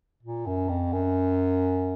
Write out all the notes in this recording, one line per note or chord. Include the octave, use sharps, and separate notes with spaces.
A#2
F#2
F2
F#2